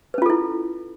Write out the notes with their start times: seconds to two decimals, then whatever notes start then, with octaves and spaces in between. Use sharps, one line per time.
0.14 B4
0.18 C#4
0.22 F4
0.26 A4
0.30 E4